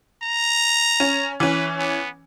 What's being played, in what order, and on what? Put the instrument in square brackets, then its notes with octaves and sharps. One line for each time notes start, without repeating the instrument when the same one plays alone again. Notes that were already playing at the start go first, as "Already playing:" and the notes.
[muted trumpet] A#5
[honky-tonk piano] C#4
[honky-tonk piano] E3 C#4 [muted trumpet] B4
[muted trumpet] B3